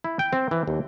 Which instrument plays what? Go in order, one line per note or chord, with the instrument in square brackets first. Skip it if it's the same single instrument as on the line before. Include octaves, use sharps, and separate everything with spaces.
[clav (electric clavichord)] E4
G5
C4
E3
D#2